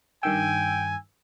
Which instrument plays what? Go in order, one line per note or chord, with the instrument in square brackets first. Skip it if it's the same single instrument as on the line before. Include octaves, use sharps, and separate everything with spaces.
[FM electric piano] G2 D#3 E6 [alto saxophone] G5 [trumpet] G#5